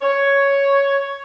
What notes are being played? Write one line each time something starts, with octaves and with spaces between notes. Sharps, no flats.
C#5